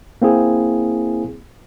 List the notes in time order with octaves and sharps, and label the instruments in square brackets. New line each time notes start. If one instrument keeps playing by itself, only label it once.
[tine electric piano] A#3 C4 E4 G#4